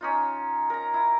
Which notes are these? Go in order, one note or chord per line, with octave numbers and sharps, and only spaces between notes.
C#4 D#4 F4
A#4 A#5
E4